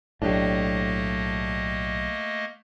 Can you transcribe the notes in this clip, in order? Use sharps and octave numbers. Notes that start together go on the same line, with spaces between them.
B1 A2 F#3 A3 A#3 D4 G4 D#5